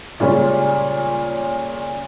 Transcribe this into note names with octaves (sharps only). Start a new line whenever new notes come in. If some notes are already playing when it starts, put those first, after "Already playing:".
A#2 C#3 G3 G#3 C#4 F4